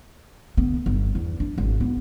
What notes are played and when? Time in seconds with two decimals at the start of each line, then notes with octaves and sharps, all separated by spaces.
0.57 D3 B3
0.86 G1
1.15 E2
1.40 D4
1.58 G#1
1.81 B3